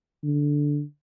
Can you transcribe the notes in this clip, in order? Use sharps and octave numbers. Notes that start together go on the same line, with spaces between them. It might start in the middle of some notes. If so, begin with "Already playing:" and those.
D3